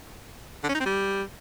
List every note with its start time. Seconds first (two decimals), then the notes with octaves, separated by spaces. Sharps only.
0.64 D3
0.69 C#4
0.75 D#4
0.80 C4
0.86 G3